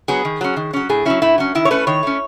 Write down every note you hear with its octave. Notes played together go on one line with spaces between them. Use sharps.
F#3 B3 G#4
D#3
F#3 C#4
D#3
F#3 C#4
A2 G#4
F#3 C#4 E4
A2 E4
F#3 C#4
D#3 E4
C#5
A3 C#4 B4
D#3 C#5
A3 C#4